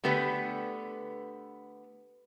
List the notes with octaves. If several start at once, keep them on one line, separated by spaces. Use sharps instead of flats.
D3 A3 B3 G4 B4